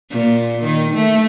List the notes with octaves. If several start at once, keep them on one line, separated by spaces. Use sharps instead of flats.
A#2
D#3
A3